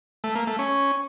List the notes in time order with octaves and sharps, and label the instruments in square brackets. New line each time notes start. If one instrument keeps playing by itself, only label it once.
[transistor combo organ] A3
A#3
A3
C#4